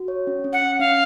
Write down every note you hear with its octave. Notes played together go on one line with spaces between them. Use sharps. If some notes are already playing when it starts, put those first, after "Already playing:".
Already playing: F#4
C#5
C#4
C#4
F#5
C#4
C#4 F5